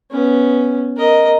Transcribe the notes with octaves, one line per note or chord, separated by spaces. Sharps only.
B3 C#4
A#4 D#5